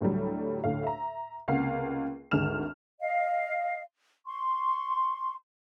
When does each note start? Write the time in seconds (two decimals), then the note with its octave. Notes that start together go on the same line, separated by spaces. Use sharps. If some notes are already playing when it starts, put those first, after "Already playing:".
0.01 D2 A2 F#3 G3
0.64 D2 A2 F5
0.83 E5 A#5
1.48 C#2 C3 A#3 F5 F#5 C7
2.31 G#1 D2 G#3 F6 E7
3.00 D#5 F5
4.26 C6 C#6